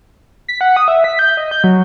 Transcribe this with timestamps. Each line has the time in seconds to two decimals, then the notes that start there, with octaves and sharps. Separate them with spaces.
0.48 B6
0.61 F#5
0.76 D#6
0.88 E5
1.04 B6
1.19 G6
1.37 D#5
1.51 G6
1.64 F#3